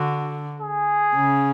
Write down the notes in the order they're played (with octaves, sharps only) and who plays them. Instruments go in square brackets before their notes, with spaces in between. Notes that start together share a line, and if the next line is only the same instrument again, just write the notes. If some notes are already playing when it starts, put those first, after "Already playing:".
Already playing: [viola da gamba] D3 [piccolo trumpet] F#4
[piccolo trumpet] G#4
[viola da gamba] C#3